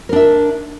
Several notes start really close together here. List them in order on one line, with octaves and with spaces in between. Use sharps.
A#4 D4 E5